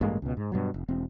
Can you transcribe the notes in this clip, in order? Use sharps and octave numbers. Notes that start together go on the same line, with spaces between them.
A1 G2 G#3 A#3
C#2 B2
G#2
G2 B2 F#3
F1
E1 C4